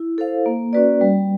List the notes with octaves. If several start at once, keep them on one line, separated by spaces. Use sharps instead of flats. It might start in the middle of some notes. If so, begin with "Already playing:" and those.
Already playing: E4
A4 C5 F5
A#3
C#4 F#4 B4 D5
G3